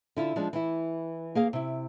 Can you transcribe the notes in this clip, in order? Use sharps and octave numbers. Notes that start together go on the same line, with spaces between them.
D3 E4 F4
F3 G#3 D4
E3 E4
A#3 G#4 F5
C3 E4